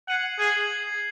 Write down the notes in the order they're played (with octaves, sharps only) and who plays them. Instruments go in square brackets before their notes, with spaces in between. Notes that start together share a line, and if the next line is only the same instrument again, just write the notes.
[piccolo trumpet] F#5 [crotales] G#6 C7 D#7 F#7
[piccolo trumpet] G#4 [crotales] G#6 C7 D#7 F#7